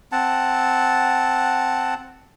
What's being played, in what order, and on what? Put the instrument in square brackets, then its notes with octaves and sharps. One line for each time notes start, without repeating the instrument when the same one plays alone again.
[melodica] C4 F#5 A5